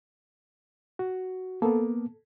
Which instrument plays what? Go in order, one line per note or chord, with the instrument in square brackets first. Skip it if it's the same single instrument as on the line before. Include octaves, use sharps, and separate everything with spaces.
[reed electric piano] F#4
[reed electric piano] A#3 B3 [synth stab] A4